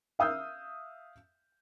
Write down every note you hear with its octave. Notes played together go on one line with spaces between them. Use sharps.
E5 F5 D#6 E6 G6